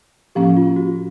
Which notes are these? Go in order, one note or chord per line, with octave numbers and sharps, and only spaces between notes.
A2 F3 A#3 C#4 G4
F4
F#4